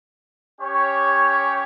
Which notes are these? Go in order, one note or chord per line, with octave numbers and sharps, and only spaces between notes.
C#4 G4 C#5